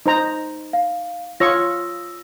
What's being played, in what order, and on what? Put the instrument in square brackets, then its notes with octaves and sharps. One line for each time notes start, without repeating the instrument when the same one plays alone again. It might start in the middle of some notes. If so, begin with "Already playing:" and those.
[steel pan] D#4 C5 A#5
[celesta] F5
[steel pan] F4 C#5 C#6 [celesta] D#6 E6 A#6